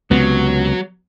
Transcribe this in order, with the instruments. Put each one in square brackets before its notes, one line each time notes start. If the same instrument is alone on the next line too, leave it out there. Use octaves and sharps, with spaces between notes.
[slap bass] C#2 C3 [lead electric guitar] F#3 [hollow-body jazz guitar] B3